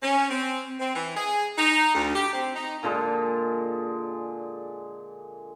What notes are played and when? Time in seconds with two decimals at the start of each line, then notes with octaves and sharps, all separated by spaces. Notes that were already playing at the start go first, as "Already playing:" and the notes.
0.02 C#4
0.30 C4
0.80 C4
0.95 E3
1.15 G#4
1.57 D#4
1.94 D2
2.14 G4
2.32 C4
2.55 D#4
2.83 A#2 D3 G#3